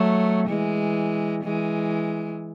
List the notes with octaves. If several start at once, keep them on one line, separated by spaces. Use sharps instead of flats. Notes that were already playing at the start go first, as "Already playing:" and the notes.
Already playing: F#3 A3
E3 G#3
E3 G#3